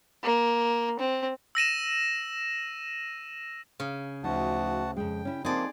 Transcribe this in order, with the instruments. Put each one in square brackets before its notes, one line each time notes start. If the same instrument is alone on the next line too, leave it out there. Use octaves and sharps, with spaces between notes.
[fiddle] A#3
C4
[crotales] E6 A#6 D#7 E7
[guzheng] C#3
[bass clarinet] D2 [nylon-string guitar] F3 D#4 [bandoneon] F#4 F#5 A5
[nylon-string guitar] F2 G#3 [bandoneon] G5
[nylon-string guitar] C#4 E4
[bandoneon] F3 A#3 [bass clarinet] C4 [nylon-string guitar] D#4 A4 [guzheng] G#4 D5